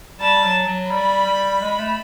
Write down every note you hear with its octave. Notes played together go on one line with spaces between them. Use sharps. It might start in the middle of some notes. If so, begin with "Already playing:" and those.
G3 A5
F#3
F#3
G3 B5
G3
G#3
A3